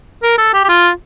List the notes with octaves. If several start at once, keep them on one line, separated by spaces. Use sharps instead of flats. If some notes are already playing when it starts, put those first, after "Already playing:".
A#4
A4
G4
G4
F4